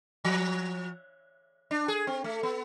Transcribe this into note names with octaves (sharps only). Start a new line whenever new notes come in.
F3
D4
G#4
C4
A3
B3